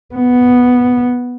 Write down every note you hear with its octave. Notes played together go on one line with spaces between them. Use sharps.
B3